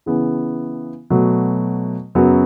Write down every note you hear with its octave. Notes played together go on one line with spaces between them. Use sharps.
C#3 E3 B3
B2 F#3 A3
F#2 C#3 F#3 B3 F#4